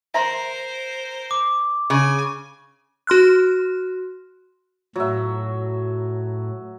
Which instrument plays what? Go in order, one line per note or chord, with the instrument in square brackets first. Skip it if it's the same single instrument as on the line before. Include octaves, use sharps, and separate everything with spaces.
[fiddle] A#4 C5 [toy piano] E5 A#5 C6
[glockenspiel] D6
[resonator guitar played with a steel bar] C#3 [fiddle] G#5
[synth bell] F#4 C6 F6 F#6
[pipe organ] A2 [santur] F#3 E5